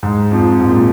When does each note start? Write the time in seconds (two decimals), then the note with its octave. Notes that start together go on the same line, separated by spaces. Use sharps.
0.03 G#2
0.32 F2
0.60 G#2
0.69 A#2